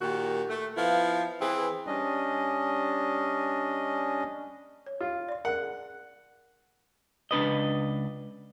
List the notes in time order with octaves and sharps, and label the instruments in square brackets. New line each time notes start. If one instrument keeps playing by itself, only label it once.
[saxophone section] A#2 D#3 F#4 G4
A3
F3 B3 E4 F5
E3 C4 G#4 B4
[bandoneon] G3 C#4 D4 D#5
[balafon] C#5
[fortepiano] F4
[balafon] D5 C6
[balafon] G#4 A#4 [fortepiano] F#5
[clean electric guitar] C#2 D4 B4 D#5